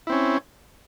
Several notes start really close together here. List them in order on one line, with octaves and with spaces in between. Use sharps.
E4 C4 C#4